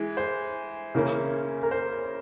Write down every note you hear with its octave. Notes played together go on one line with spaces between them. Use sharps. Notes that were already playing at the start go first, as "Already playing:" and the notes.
Already playing: E3 G#3
C5
C#3 E3 A#3 C#4
A#4
C5